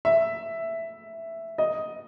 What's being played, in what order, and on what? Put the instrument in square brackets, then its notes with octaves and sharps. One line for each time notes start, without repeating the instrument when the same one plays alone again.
[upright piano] E5
D#5